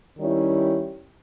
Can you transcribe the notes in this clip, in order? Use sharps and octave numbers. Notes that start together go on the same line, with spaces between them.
D#3 G3 C#4 E4